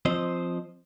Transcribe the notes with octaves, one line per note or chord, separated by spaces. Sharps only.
F3 C4 C5 D#5